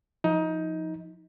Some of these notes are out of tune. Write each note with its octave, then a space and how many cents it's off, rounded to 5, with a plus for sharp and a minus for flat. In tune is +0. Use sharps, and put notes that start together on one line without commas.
F3 +5 D#4 +20